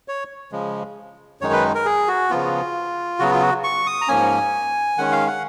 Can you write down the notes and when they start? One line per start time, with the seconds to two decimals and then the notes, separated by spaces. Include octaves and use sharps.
0.08 C#5
0.52 C#3 F3 G#3
1.41 F#2 D#3 G#3 D#4 C#5
1.53 B4
1.75 A#4
1.85 G#4
2.08 F#4
2.30 C#3 F3 B3 F4
3.19 C#3 F#3 B3 F#4
3.31 F4
3.42 F#4
3.64 C#6
3.87 D#6
4.01 A#5
4.08 G#2 F3 A#3 C#4 G#5
4.98 D#3 G#3 C#4 F#5
5.12 F5
5.27 F#5